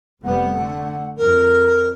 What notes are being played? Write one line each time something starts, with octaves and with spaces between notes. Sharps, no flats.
F1 G3 B3 F#5
D3 A3
F2 A#4